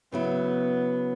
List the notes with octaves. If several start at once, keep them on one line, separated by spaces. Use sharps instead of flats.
C#3 F#3 B3 E4